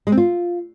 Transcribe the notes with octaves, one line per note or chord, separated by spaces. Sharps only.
G#3
C4
F4